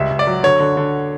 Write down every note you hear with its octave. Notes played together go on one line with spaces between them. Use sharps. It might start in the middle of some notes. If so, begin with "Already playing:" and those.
Already playing: C#2 G3 E5
C#2
D5
F#3
D3 C#5
D3
D3